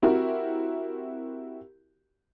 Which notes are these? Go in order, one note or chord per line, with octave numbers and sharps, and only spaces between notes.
C4 E4 F#4 G4 A#4